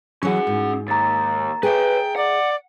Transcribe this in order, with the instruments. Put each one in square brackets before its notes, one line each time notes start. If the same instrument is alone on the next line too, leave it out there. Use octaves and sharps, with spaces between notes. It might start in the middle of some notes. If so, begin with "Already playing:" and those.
[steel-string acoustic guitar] E3 F#3 [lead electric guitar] C#4 F#5 [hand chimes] F#4 G#4
[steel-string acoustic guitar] G#2
[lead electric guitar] D#2 [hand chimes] A#5 A6
[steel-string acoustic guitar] G#4 E5 [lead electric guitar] B4 C#5 [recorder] G5
[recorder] D5 [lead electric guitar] F#5